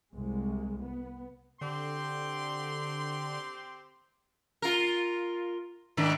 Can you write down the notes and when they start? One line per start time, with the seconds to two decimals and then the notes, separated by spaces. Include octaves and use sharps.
0.12 C2 G#3
0.83 B3
1.61 D3 C4 G4 C6
4.62 F4 A#4
5.97 G#2 D#3 D4